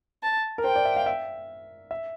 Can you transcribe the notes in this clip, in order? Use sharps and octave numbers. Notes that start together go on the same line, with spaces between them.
A5
A#4
C5 G5
D5
E5
F5
E5
E5